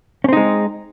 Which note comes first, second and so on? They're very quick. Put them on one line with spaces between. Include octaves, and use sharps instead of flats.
C#4 C4 D#4 G#3